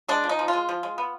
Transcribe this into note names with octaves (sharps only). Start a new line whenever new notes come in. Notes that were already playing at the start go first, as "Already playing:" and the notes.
G#3 D4
F3
D#4
F3
F4
G#3
F3
G#3
B3